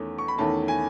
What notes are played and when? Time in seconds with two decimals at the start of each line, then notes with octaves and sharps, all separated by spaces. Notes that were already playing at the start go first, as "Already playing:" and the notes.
Already playing: E2 D#3 A3 C#4
0.18 C#6
0.28 B5
0.38 E2 D#3 A3 C#4 A5
0.68 G#5